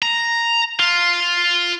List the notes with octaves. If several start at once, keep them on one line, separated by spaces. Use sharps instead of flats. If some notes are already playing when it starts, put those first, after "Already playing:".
A#5
F4